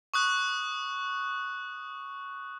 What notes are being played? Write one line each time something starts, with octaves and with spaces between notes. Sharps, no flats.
C#6 D#6 F#6